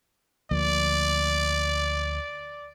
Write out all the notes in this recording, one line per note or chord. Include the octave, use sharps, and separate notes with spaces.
D2 F3 A#3 D5